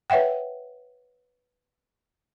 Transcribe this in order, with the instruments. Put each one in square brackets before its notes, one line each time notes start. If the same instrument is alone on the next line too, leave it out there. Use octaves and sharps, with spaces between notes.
[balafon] B4 C#5 E5 F#5 G5